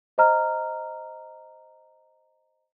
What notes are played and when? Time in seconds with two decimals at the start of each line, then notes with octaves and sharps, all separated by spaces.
0.18 C5 D#5 A#5 F6